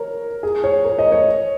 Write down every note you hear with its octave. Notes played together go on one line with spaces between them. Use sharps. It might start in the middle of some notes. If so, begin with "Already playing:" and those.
Already playing: A#4 C#5
G#4
C#5
A#4
D#5
C#5